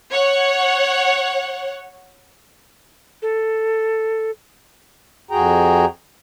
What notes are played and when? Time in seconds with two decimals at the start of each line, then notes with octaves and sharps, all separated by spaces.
0.12 C#5 F#5
3.22 A4
5.31 F2 F#4 G#4 G5 A#5